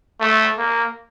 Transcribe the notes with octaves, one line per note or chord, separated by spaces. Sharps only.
A3
A#3